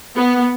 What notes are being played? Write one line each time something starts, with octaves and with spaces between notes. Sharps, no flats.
B3